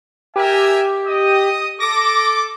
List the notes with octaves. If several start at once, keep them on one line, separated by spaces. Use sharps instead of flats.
G4 A#4 E5 G#5
D#5 D#6
A4 D6 A#6